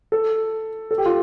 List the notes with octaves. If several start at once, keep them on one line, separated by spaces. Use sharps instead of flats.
A4
A4
G4
F4